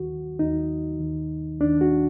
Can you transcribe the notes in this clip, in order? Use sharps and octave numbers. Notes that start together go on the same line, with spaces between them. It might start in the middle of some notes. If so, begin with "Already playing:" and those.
Already playing: D#2 D#3 F#4
D#2 D#3 D#4
D#2 D#3
D#2 D#3 D4
F#4